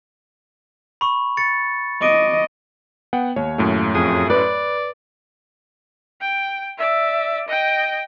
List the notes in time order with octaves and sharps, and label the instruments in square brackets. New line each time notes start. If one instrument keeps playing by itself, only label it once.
[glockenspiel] B5 C#6
A6 C#7
[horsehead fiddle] D#5 [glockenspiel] D6 D7
[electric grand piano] B3 F#5 G5
[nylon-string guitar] D#2 [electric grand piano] C#5
[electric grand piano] F#2 A2 A3
[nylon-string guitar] F2 [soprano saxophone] G#4
[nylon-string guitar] B4 [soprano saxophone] D5
[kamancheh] G5
D5 E5
D#5 G5